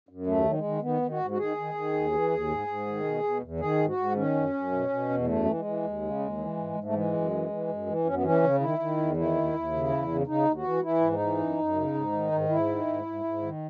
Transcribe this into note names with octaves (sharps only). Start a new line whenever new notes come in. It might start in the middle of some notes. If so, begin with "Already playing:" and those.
F#2
D#2 A3
D#3 F#3
G#3
D#3
D#3 B3
D#3
F#4
G#2
F#4
D#3 G#4
D#3
D#3
D#2
E3
D#2
G#2
G#2
D#3
B2
B2
E2
D#3 G#4
G#2
F#4
G#2
D#3 C#4
F#2
F#2
B2
B2
E2
F#2 A3
E3
G#3
E3
D#2
C#3
D#2
E3
G#2
G#2
A3
E3 G#3
F#2
E3
E3
F#2
E3
F#2 C#4
B3
E3 C#4
C#3
D#3 E4
D#3
E2
D#3 E4
D#2
D#2
C#3
E2
C#3
C#3 D#4
D#2
F#4
E3
E3 E4
G#2
D#4
E3
F#2
F#2
C#3
G#2
D#3
G#2
G#2 E4
D#3
G#2
G#2
G#2
D#3